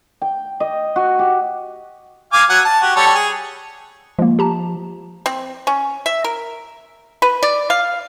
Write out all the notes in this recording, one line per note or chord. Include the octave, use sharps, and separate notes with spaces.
G5
D#5
F#4
G4
F5 G#5 D6
F#3 F#5 G#5
A5
F#4 G4
G3 A4 C#5
G#4
F3 G#3 A#3
G4 A5 A#5
C4
C#4
E5
A#4
B4
D5
F5